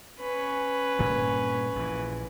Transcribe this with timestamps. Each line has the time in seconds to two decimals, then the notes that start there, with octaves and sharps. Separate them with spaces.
0.20 C#4 B4
0.99 G2 A#2 A#3
1.76 A#1 E3